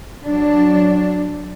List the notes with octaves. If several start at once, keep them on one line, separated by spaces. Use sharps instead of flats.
F#3 D4